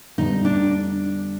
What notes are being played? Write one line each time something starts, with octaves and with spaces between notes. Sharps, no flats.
F2 D3 G3 B3 D#4
D4